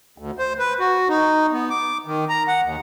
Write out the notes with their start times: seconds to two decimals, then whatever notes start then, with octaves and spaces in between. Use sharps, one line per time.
0.18 D2
0.39 C5
0.59 B4
0.80 F#4
1.08 D#4
1.52 B3
1.70 D6
2.06 D#3
2.29 A#5
2.48 F#5
2.64 D#2